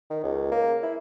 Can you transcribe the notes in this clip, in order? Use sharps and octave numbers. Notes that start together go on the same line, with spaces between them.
D#3
C#2
A#3
E4